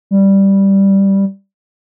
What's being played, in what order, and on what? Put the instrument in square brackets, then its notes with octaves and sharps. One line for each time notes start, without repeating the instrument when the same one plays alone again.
[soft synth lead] G3